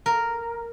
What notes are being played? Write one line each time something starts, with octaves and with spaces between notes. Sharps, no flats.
A#4